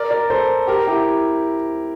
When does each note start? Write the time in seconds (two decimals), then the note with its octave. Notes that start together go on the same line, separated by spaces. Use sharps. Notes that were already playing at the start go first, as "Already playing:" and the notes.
Already playing: A#4 D5
0.11 A#4 D5
0.30 A4 C5
0.67 G4 A#4
0.87 E4 G4